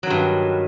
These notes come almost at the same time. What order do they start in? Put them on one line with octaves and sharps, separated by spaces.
F#3 D#3 G2